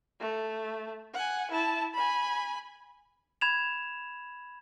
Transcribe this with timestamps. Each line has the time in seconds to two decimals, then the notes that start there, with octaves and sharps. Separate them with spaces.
0.20 A3
1.14 F#5 G#5
1.51 E4 A5
1.94 G#5 B5
3.41 B5 G#6 E7 F7